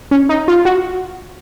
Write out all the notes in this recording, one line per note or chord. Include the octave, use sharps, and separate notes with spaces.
C#4
D#4
F4
F#4